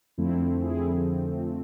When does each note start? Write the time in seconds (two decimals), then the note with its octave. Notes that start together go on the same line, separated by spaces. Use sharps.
0.18 F2 D3 F3 A3 C4 E4
0.61 E4 G#4